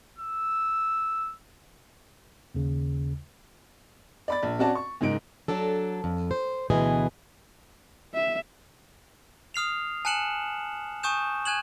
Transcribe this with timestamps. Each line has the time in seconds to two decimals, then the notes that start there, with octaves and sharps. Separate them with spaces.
0.18 E6
2.55 D#2 C#3
4.28 D5 B5 A6
4.43 A#1
4.59 C4 C#4 F#4 D5 A5
4.75 C#6
5.01 F#1 G#2 D#4 D7
5.48 F#3 D4 A4
6.04 F2
6.31 C5
6.70 D2 B2 E3 G#4 D#5
8.14 E5
9.54 D#6 F6 C7 F7
10.05 G#5 A5 F#6 C#7 E7 F#7
11.03 G#5 C#6 D#6 G6 E7
11.45 G#5 F#6 G#6 E7 F#7